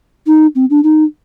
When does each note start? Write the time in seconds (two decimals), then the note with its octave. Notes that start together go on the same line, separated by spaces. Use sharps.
0.27 D#4
0.55 C4
0.70 D4
0.84 D#4